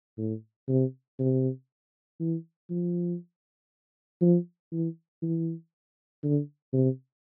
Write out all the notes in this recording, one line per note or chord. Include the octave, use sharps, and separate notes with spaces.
A2
C3
C3
E3
F3
F3
E3
E3
D3
C3